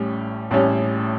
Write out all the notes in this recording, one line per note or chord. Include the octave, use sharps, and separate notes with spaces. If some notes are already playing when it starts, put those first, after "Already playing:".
Already playing: A1 A2 G3 C#4
A1 A2 G3 C#4